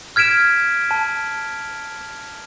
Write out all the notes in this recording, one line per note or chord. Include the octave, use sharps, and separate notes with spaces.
F6 G#6 B6 D7 E7
A5